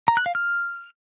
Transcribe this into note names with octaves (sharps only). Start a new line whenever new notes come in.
A#5
F#6
F5
F6